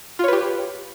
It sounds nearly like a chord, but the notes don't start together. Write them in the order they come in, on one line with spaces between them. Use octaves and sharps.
F4 C#5 B4 G4